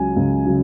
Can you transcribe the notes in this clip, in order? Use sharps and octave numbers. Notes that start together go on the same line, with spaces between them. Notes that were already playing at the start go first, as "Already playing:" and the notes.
Already playing: C#2 C#3 F#3 G#5
C#2
C#3 F#3